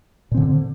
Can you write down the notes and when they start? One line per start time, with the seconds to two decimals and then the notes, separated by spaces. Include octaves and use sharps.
0.32 A#2
0.34 C4
0.37 D3